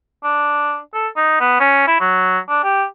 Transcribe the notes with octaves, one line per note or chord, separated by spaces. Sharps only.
D4
A4
D#4
B3
C#4
E4
F#3
D4
G4